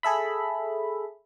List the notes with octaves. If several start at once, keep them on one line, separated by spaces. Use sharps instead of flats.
G#4 A4 E5 B5